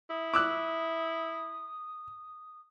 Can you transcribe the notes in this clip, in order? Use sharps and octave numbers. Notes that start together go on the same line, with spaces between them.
E4 D#6
D6 E6 F#6